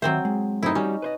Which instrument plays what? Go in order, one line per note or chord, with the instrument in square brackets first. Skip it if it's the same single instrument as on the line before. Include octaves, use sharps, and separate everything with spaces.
[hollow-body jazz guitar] D#3 E5 [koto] F#3 C4 C5
[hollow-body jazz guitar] G#3
[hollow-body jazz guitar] F#2 A3 C4 [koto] D#4 E4
[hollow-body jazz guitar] G3 F#4 [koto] C#4
[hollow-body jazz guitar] B4 C5 D#5